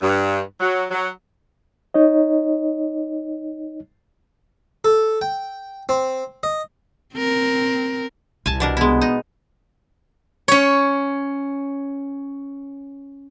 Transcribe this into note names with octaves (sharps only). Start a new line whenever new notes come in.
G2
F#3
F#3
D#4 C#5 D#5
A4
G5
C4
D#5
C4 A#4
C2 G#5 A5
B2 D4 A#4
G#3 B3 E4
D#4
C#4 C#5